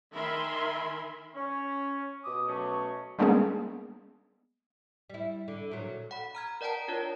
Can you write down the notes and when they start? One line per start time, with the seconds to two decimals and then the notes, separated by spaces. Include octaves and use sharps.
0.14 D#3 A#4 E5 G#5 B5 C6
1.35 C#4
2.24 B2 D6 D#6
2.47 B2 F#3 A3 C#4
3.19 G3 G#3 A#3 B3 C#4 G#4
5.10 G3 E4
5.48 D3
5.71 A#2 F#3
6.11 F#5 B5
6.35 A#5 F6 G#6
6.61 A#4 D5 F#5 G5 A5 A#5
6.88 D4 F4 A#4 C#5 D5